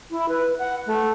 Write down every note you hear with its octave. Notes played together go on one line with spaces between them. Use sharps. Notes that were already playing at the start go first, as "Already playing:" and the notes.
E4
B4
F#5
A3